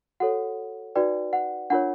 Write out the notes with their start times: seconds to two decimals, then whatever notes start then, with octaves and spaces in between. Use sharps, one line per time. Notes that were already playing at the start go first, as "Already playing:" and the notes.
0.20 F#4 A4 C#5 F#5
0.95 D#4 F#4 B4 D5 G5
1.33 F#5
1.70 D4 F4 A#4 C#5 F#5